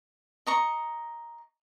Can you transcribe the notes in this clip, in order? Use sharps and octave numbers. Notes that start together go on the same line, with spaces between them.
D#5 A#5 C#6